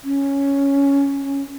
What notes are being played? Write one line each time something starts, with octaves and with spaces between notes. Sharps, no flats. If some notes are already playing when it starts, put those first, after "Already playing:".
C#4